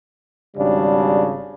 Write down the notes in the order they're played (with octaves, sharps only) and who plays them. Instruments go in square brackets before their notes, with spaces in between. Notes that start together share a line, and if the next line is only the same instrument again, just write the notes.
[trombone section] G#1 C#3 D4 [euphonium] G3